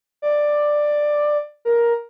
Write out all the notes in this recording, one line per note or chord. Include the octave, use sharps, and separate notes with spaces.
D5
A#4